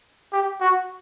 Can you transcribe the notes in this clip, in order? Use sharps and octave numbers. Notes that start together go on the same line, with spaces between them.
G4
F#4